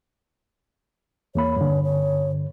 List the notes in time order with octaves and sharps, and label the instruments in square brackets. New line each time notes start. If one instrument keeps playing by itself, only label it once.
[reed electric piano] E2 A#3 B5 [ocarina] C#5
[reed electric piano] G2 D3
[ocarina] C#5